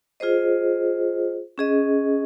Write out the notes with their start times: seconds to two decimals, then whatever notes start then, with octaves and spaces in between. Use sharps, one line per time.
0.20 F4 G#4 C5 D#5
1.58 C#4 G#4 D#5